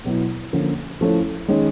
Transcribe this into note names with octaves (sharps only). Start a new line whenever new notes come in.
B2 F#3 B3 E4
D3 F3 A#3 C#4
F3 A3 C#4 E4
D#3 G#3 C#4